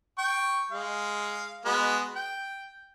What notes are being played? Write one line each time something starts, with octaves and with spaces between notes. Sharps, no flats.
G5 C#6
G#3 F5
G#3 B3 F#4
G5